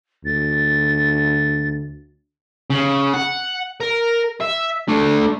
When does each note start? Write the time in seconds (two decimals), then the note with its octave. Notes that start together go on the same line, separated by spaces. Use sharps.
0.25 D2 A6
2.70 C#3
3.14 F#5
3.81 A#4
4.40 E5
4.88 A3 D4